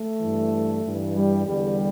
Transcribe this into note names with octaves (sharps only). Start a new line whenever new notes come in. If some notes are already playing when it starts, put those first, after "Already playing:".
Already playing: A3
G2 E3
G2 E3
G3
E2 D3 G3